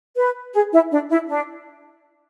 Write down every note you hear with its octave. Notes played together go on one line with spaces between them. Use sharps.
B4
G#4
E4
D4
E4
D4